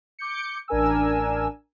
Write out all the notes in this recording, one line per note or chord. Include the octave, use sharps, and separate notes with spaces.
D6 G6 C#7
A1 D4 A#4 G#5 E6